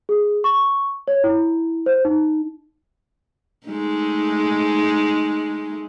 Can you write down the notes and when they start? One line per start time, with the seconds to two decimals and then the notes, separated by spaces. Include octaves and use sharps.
0.09 G#4
0.44 C#6
1.08 C#5
1.24 E4
1.86 C5
2.05 D#4
3.67 G#3 A3 D#4